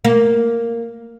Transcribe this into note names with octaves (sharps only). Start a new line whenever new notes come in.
A#3